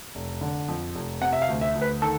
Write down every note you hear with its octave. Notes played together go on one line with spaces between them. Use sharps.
F1
D3
F2
F1
C3 F#5
E5
F5
D2
E5
D2
B4
D#3 A4